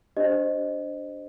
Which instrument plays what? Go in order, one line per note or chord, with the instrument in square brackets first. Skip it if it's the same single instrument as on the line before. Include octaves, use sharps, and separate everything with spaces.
[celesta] D4 G4 C5 D#5